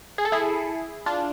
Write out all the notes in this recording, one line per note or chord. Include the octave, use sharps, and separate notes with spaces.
G#4
A4
E4 G#4
D4 F4